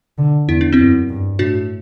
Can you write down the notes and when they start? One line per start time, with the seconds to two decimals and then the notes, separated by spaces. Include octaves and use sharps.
0.18 D3
0.48 E2 E4
0.61 D4
0.73 C4 E4
0.79 F#2
1.09 G2
1.39 A2 D4 F#4